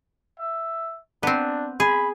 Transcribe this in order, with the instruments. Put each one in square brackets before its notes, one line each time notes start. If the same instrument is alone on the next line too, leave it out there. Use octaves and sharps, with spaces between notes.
[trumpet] E5
[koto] B3 C4 [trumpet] D4
[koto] G#4 [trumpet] B5